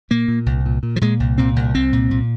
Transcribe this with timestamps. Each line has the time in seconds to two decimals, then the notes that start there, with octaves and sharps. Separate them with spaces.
0.11 A#2 A#3
0.28 A#2
0.46 C2
0.66 A#2
0.83 A#2
0.96 F3
1.01 A#2 G#3
1.20 C2
1.38 A#2 C4
1.56 C2
1.75 C2 C4
1.93 A#2
2.11 A#2